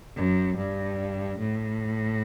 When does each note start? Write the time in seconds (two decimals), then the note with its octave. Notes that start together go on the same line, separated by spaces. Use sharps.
0.16 F#2
0.57 G2
1.39 A2